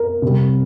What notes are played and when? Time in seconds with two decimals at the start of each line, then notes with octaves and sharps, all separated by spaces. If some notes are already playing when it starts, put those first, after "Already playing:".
Already playing: A#4
0.22 C3 G3